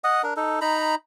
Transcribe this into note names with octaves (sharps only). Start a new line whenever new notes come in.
D#5 F#5 D#6
D4 A#4
D#4 A4
D#4 A#5 B5